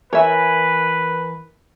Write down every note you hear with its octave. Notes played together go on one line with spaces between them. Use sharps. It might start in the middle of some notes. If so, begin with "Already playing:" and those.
E3 A#4 B4 C#5 E5 G#5